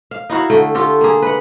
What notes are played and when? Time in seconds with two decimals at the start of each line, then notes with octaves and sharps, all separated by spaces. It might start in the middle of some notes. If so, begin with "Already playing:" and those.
0.11 F5
0.30 D#4 E4 F#4 F5
0.50 D3 A3 G5
0.75 F4 G4 A4
1.01 A#3 G#4
1.22 B4 F#5